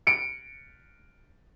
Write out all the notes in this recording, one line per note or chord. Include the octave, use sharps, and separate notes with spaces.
C#7 D7